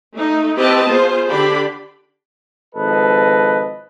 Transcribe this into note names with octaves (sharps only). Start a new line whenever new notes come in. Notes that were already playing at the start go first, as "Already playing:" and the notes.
A3 D#4
C4 E4 G4 B4 D#5 A5
B3 F4 G#4 C5
D3 D4 G4 B5
G#1 F3 A4 B4 D#5